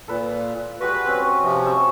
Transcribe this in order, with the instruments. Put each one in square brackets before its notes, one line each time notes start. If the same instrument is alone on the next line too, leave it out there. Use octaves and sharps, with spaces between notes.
[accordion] A#2 [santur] A4 B4
[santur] G3 G#3 F#4 [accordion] B4
[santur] C4 C#4
[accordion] C3 F3 [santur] D#5
[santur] E5 C#6